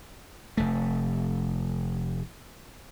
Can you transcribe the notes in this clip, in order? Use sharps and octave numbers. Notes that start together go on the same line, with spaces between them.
F1 A3